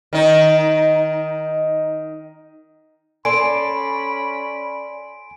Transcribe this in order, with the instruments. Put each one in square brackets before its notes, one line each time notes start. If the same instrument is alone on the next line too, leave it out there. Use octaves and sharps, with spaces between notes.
[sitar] D#3 D#4
[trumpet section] C#4 B5 [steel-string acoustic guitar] A4 D5 [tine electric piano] G#5 C6 [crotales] D7